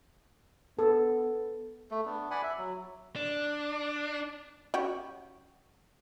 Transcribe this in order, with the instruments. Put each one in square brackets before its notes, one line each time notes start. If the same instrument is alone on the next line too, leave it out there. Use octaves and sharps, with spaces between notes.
[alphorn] B3 [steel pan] A4
[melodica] A3
B3 D4
D5 F#5 G#5 B5
E5
F#3
[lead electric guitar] D4
[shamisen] C#4 F#4 G4